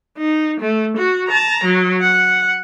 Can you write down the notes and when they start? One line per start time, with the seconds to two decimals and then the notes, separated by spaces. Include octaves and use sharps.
0.18 D#4
0.60 A3
0.97 F#4
1.28 A5 A#5
1.64 F#3
2.01 F#5